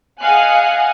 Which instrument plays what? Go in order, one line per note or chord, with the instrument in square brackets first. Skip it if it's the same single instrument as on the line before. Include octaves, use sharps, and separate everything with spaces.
[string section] G#4 D#5 F5 F#5 G#5 F#6